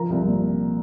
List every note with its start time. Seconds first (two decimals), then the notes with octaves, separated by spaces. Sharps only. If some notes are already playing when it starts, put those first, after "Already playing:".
Already playing: F3 A#4 A#5
0.10 C2
0.26 A#2